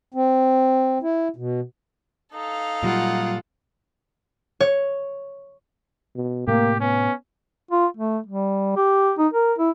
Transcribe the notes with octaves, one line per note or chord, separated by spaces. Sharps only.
C4
E4
B2
D#4 A4 F5
A#2 F#3 G3 F4 F#5
C#5
B2
A2 C3 A3 A#3 G4
B3 C#4
F4
A3
G3
G4
D#4
A#4
E4